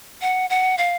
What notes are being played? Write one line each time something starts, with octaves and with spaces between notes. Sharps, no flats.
F#5
F#5
F5